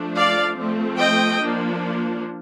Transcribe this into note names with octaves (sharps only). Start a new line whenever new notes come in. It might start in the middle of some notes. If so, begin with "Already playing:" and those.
Already playing: F3 A3 D4
D5 F5
F3 A3 C4
D#5 G5
F3 A#3 D4